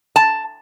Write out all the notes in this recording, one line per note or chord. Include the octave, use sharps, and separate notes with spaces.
A5